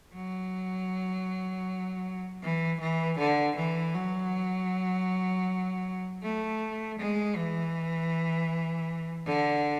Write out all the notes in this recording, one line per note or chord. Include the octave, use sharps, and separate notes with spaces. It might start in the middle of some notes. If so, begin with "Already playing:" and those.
F#3
E3
E3
D3
E3
F#3
A3
G#3
E3
D3